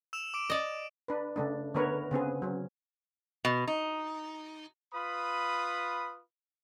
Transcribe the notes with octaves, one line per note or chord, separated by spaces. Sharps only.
E6 E7 F7
D6 D7
D5 D#5
D4 B4
C#3 A3 D4
D3 A3 B3 A#4 B4 C#5
C#3 B3 C4 G#4
F#3 C#4
B2
D#4
F4 B4 B5 D#6